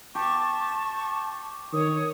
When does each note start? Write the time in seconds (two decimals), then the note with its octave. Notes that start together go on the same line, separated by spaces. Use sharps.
0.15 G4 A5 C#6
1.73 D#3 C#5 D#6